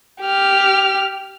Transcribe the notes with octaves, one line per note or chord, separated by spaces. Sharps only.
G4 F6